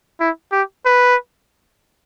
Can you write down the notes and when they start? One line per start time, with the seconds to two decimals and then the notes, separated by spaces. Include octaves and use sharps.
0.20 E4
0.52 G4
0.86 B4